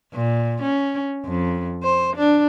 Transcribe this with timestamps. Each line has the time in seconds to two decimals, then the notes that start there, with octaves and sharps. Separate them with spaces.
0.14 A#2
0.62 C#4
1.25 F2
1.83 C5
2.17 D4